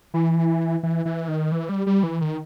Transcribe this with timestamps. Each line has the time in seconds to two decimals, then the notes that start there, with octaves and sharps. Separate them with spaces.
0.14 E3
0.83 E3
1.05 E3
1.28 D#3
1.52 E3
1.69 G3
1.86 G3
2.03 E3
2.21 D#3